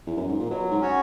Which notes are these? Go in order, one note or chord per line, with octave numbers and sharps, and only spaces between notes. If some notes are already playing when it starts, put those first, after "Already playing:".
E2
F#2
G#2
A#2
B2 F#3
G#2
C#4 F#4 C#5